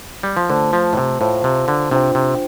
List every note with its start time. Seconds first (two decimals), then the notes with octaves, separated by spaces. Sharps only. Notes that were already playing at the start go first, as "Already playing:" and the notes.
0.23 G3
0.37 F3
0.50 D3 A3 F4 C5 A5
0.73 F3
0.93 A2
0.97 C3
1.20 A2 F4 C5 F5 A5
1.44 C3
1.68 D3
1.91 C3 D4 F4 C5 G5
2.15 C3